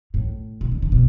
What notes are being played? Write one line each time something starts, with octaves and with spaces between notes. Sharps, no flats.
A2
B2
C#3
D3
B2